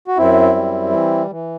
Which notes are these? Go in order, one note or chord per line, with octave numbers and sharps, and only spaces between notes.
F#4
F#2 C4 E4
G3
E3
E3